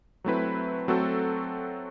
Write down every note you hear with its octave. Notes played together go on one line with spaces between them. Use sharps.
F#3 A3 C4 E4 B4
F#3 A3 C4 F#4 A4